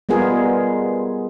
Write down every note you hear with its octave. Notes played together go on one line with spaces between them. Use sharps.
G3 G#3 B3 F4 G#4 A#4